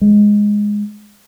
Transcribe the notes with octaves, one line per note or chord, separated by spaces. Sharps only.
G#3